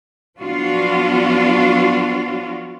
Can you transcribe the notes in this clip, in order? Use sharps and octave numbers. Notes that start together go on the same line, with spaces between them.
F3 F#3 B3 D4 F4 F#4